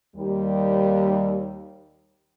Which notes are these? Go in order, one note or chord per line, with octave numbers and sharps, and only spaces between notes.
D#2 G3